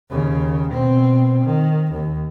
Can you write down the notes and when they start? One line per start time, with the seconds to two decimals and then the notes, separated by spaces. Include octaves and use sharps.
0.10 D#2 C#3
0.70 B2 C4
1.44 D#3
1.92 D#2